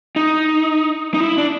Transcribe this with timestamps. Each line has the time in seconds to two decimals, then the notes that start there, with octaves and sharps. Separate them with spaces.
0.16 D#4
1.14 D#4
1.20 E4
1.38 D4